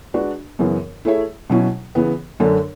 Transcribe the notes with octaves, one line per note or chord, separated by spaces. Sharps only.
G#3 D4 F#4 B4 D5
F#2 C#3 E3 B3
A3 E4 G#4 C#5 E5
B2 F#3 C#4 E4
C#3 E3 B3
F#2 D3 A3 D4